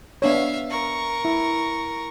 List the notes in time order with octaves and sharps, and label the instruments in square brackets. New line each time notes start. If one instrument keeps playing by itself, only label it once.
[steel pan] B3 D4 C#5 [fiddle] E5 F5
[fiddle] A#4 C#6
[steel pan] E4